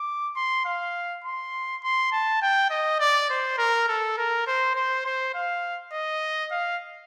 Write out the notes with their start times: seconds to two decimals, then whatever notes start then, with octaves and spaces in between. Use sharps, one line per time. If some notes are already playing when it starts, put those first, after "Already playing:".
Already playing: D6
0.36 C6
0.65 F5
1.24 C6
1.83 C6
2.12 A5
2.42 G5
2.70 D#5
3.00 D5
3.30 C5
3.58 A#4
3.88 A4
4.18 A#4
4.47 C5
4.75 C5
5.05 C5
5.34 F5
5.93 D#5
6.51 F5